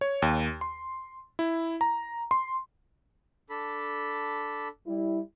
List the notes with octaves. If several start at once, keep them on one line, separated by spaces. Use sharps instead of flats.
C#5
D#2
C6
E4
A#5
C6
D4 A4 B5
G3 E4